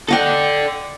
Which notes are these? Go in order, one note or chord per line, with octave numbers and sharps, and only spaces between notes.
A4 D5 D#5 F#5 G5